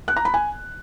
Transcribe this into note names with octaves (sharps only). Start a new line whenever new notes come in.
F#6
A#5
B5
G#5